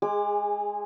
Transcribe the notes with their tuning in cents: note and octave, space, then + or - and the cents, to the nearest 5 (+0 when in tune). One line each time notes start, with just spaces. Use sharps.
G#3 +0 G#4 -25 D6 +25